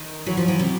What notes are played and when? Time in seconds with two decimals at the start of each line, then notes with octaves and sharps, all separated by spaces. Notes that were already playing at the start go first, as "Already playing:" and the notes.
Already playing: D#3
0.26 E3 F#3
0.37 F3
0.48 E3
0.59 C3